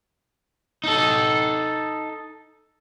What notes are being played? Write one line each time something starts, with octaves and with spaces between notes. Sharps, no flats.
D#4 A4